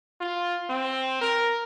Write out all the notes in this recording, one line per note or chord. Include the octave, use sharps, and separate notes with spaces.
F4
C4
A#4